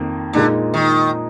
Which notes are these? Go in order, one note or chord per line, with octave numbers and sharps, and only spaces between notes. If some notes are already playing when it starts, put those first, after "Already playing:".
Already playing: F2 D#3 A#3
A#2 D3 G#3 D#4
D#3